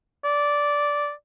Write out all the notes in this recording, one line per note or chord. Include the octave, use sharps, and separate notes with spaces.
D5